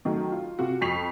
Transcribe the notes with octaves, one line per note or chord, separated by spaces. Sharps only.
D#3 F#3 A3
F4
C3 F4 F#4
F2 C#6 B6 C7 F7